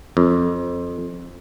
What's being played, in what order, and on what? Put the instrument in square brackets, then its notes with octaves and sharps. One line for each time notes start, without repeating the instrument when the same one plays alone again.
[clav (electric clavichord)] F2